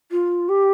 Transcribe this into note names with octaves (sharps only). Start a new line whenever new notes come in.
F4
G4